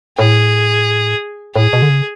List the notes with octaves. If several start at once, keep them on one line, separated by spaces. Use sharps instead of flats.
A2 G#4
A2 G#4
B2
D3
C#3